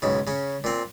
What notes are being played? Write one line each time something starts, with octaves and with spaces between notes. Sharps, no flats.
B1 G#2 C#3
C#3 C#4
A#2 C4